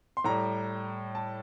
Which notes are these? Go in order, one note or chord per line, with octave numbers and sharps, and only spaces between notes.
C6
A2 G3 A#5
A5